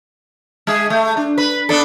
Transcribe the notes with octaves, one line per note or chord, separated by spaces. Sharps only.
G#3 G#4
A3
D4
B4
B3 D4 A4